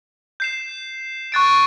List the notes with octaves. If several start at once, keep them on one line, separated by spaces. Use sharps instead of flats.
G6 C7 E7
C#6 F#6 A6 D7